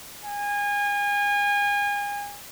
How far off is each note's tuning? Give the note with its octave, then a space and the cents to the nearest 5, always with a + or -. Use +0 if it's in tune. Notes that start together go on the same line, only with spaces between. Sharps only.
G#5 -30